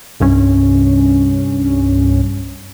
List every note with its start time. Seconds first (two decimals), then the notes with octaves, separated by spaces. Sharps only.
0.20 C2 G2 C#4